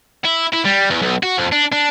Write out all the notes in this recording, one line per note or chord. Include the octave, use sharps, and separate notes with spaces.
E4
E4
G3
E2
B1
F#4
F2
D4
D4